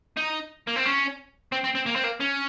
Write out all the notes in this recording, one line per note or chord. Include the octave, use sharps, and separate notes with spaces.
D#4
A#3
C4
C#4
C4
C4
C4
A#3
C4
A#3
C#4